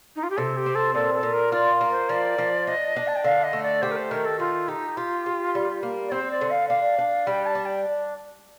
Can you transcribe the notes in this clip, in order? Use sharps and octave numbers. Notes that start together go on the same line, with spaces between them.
D#4
F4
G4
C3 A4
G4
C4
A4
A#2 A4
A4
A#2
A#4
F4 D5
A#3
C5
F3 D5
F3
D4 D#5
D4
A5
G5
D3 F5
D#5
A3
D5
G4 C5
A#4
C5
D#3 A#4
A4
A3 F4
D#4 G4
F4 G4
G4
G3
A#3
D5
C4 C5
D5
D3
F5
D4 F5
D4
G3 G5
A5
D4
G5